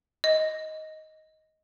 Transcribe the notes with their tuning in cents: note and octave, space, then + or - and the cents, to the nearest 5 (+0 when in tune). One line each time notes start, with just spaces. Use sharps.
D#5 +10